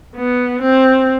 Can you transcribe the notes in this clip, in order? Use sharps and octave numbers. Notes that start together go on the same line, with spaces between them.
B3
C4